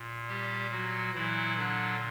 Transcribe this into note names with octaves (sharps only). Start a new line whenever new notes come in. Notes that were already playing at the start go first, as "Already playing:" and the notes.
Already playing: A#2
G3 G4
F#3 F#4
A#2 E3 F#3 E4
D3 D4